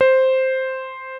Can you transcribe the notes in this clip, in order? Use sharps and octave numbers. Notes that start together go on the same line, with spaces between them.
C5